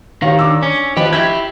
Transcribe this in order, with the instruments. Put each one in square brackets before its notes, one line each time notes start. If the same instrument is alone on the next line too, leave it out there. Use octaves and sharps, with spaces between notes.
[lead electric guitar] D#3 [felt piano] G4 C#5 F5
[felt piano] D4 D6 E6
[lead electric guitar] C#4
[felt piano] F3 D#5 [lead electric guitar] G4 B4
[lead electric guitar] E4 G4 [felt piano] G#6